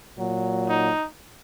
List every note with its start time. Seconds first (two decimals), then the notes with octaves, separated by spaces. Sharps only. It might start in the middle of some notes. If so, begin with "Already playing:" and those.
0.18 A#2 F#3
0.69 D#4